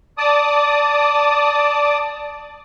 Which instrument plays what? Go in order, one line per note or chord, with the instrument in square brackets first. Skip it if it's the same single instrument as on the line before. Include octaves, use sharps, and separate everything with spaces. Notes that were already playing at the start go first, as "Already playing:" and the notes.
[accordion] D5 A5 D6 D#6